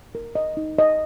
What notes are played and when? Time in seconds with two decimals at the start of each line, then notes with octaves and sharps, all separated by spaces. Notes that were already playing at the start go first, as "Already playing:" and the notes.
0.15 A#4
0.35 D#5
0.57 D#4
0.78 D#5